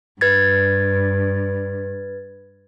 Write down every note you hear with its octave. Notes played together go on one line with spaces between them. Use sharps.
G2 B4 G#6 A6